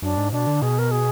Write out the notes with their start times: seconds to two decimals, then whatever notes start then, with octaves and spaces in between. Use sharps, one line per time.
0.02 F#2 D4
0.17 G#2
0.32 B2 D4
0.47 D3
0.62 B2 G#4
0.79 A#4
0.91 G#4